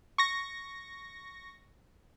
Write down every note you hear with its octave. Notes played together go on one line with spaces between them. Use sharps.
C#6 A#6